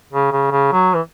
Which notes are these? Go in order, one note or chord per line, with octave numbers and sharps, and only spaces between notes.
C#3
C#3
C#3
F#3
E3